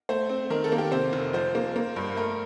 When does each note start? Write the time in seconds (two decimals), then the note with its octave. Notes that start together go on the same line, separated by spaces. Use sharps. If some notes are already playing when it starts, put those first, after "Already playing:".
0.09 A3 C5
0.30 C4
0.50 D#3 A#4
0.64 A4
0.72 A#3
0.78 G4
0.92 C3 C5
1.13 F1
1.33 F3 C5
1.55 A#3
1.76 A#3
1.96 G2
2.17 A3 A#4